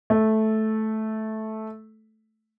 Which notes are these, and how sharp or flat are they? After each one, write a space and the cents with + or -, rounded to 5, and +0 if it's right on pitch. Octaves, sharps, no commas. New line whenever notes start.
A3 -10